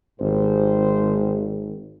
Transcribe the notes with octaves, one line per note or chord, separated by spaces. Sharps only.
G#1 G#2 G4 C5